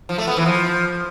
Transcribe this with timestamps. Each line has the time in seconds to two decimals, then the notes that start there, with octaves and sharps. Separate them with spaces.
0.09 F3
0.18 A3
0.27 B3
0.37 E3
0.46 F3